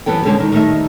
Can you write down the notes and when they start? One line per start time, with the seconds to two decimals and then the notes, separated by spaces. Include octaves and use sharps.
0.06 F#2 E3 G3 B3 A4 G5
0.25 B2 D3 G#3 C#4 A4 A5
0.40 D#3
0.52 D#3 G3 A3 C#5 D#5 E5